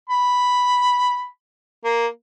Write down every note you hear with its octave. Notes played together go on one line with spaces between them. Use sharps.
B5
A#3